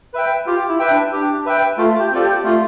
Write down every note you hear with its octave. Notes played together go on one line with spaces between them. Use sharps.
B4 E5 G5
F4 G4
E4
B4 E5 G5
D4
D4 G4
B4 E5 G5
A3 F4
G4
C4 F4 A4 D5
G4
A3 F4